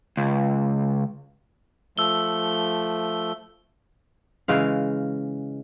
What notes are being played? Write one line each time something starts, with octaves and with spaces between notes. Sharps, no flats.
C#2
F3 A3 E6 G7
C#3 E3 G#3 F5